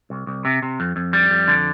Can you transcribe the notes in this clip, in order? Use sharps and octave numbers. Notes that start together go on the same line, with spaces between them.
C2
C2
C3
C3
F2
F2
G3
F2
D3